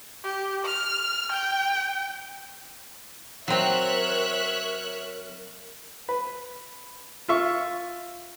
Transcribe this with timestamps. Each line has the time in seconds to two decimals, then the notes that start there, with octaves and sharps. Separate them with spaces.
0.24 G4
0.65 F6
1.32 G5
3.48 F#3 C4 A#4 C#5 E5 F#6
6.09 B4
7.28 F4 E5 C#6